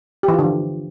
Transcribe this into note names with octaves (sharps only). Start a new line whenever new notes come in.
G4
E3
F4
D3
F3